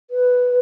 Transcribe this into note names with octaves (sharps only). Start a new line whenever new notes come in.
B4